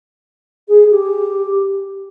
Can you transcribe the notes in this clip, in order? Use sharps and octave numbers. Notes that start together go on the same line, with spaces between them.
G#4
G4